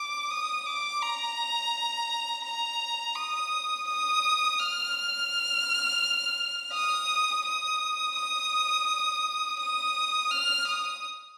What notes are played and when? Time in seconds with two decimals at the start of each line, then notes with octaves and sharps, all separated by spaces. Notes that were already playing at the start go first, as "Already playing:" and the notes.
Already playing: D6
0.30 D#6
0.66 D6
1.02 A#5
2.45 A#5
3.16 D#6
3.88 D#6
4.60 F6
6.73 D#6
7.46 D#6
8.16 D#6
9.60 D#6
10.31 F6
10.67 D#6